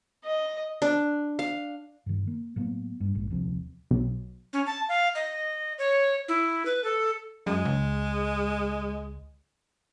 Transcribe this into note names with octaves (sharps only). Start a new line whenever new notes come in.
D#5
D4
F5
G2 D#3
A#3
A2 F#3 A#3 B3
G2
D#1 A#1 G#2
D#1 C2 F3 C4
B1
C#4
A5
F5
D#5
C#5
E4
B4
A4
F#2 G#3
C#2